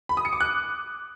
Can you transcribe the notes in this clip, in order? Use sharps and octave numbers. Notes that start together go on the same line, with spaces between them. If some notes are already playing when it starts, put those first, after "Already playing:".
B5
D#6
C#7
D6
F#6